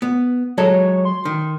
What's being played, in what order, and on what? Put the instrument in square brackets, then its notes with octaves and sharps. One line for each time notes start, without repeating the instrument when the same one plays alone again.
[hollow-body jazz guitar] B3
[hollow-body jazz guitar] F#3 G#3 A4 [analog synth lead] C#5
[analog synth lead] C6
[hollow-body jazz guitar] D#3